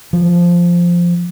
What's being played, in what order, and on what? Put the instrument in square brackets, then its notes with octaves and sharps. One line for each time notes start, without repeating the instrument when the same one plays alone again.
[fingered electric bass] F3